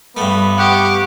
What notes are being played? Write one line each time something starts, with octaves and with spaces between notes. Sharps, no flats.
G2 A3 B3
G4 F#5 C#6 D6